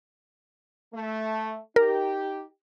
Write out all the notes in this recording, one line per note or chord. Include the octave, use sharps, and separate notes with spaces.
A3
D#4 G4 A#4